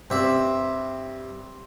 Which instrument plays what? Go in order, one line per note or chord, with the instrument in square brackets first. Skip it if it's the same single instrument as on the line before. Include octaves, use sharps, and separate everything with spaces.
[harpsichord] G2 E5 [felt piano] C4